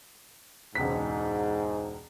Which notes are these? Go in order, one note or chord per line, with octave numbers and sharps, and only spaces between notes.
E1 C#2 G#2 B6